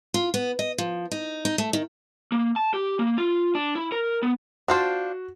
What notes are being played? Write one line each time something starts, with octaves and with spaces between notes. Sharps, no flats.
F4
B3
D#5
F3
D#4
D#4
A3
D#3
A#3
A5
G4
A#3
F4
D4
E4
A#4
B3
D4 F4 F#4 C5